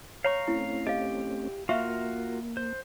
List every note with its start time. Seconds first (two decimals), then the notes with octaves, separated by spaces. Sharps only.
0.24 C#5 F5 A#5 C#6
0.48 A3 C4 C#4 E4
0.87 G4 D#5 F5
1.69 A#3 F4 F#4 A#4 E5 F5 C#6
2.57 C5